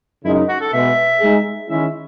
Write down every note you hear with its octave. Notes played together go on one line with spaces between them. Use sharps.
F#2 C#3 G#3 D#4 E4
F#4
A4
B2 G#3 B3 E5
G#3 D#4 G#4
D#3 G#3 C#4 E4 E5